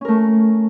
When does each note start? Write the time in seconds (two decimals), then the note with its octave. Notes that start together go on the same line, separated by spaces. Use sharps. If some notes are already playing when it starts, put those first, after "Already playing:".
0.01 C#4
0.05 A#4
0.08 A3